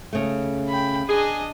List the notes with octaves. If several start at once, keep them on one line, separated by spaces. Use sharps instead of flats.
C#3 A3
G5 B5
D4 G#4 D#5